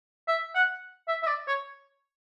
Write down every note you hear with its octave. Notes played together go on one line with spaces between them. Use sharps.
E5
F#5
E5
E5
D5
C#5